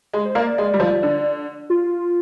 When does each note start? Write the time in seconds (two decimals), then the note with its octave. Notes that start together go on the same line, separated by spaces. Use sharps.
0.13 G#3
0.25 C5
0.35 A#3 D5
0.58 G#3
0.74 G3
0.80 F3
1.03 D3
1.70 F4